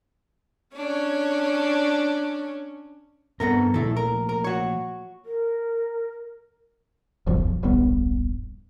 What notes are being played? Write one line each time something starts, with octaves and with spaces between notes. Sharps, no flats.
C#4 D4 C#5
G2 B3 C4 D4 A4 A#4
A#2 F3 A3 E4 A4
A#4
A#4
F#4 C#5
A#4
D1 B1 F#2 F3
D1 A#1 G2 B3